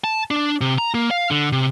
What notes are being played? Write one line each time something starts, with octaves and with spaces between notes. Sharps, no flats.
A5
D4
C3
A#5
A#3
F5
D3
C3